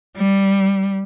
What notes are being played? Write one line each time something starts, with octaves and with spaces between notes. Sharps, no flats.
G3